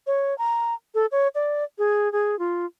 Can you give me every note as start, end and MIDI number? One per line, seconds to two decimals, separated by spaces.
0.07 0.37 73
0.38 0.74 82
0.95 1.06 69
1.12 1.28 73
1.35 1.64 74
1.78 2.11 68
2.12 2.38 68
2.39 2.65 65